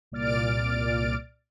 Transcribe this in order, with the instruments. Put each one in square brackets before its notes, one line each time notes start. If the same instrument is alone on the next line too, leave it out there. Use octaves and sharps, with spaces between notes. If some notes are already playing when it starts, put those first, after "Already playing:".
[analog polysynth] C2 A#2 D5 F6 A6 D7